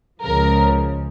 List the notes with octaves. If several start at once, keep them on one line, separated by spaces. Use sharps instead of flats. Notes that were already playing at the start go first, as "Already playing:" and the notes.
C#2 C#3 F3 A#4